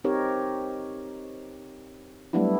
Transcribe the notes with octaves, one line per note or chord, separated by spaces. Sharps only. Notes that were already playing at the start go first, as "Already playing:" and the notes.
C4 D#4 G4 A#4 C#5
F#3 G3 A3 B3 D4 E4